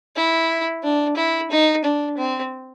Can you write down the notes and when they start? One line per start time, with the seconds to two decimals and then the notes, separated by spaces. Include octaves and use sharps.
0.16 E4
0.83 D4
1.17 E4
1.51 D#4
1.85 D4
2.17 C4